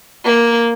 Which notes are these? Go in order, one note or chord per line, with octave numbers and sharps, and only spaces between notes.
A#3